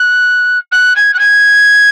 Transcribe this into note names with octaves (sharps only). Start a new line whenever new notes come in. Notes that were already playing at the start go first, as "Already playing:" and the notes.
Already playing: F#6
F#6
G#6
F#6
G#6